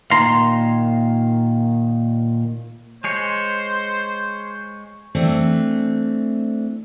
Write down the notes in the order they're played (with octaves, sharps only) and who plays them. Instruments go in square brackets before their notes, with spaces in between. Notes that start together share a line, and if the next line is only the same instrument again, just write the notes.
[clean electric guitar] A#2 D#3 A#5 C6
[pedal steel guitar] G#3 G#4 C#5 [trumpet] C5
[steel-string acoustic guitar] E3 A3 C4 D4